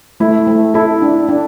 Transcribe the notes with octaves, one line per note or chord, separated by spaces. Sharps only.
A3 E4
A3
E4 A4
D4
D4